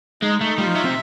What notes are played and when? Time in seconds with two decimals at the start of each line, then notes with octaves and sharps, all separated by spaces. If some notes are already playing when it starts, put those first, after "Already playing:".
0.23 G#3 D#4
0.41 A3 D#4
0.58 G3 F4
0.67 F3
0.75 F#3 E5
0.85 C3